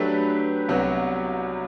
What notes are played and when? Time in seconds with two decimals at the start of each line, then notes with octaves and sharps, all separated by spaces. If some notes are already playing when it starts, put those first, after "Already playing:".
Already playing: F#3 A3 D4 G4 B4
0.68 C2 C3 F#3 B3 F#4